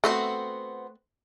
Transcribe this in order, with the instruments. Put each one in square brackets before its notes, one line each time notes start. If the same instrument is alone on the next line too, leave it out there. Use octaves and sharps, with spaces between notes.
[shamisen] A3 [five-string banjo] B3 C4 F#4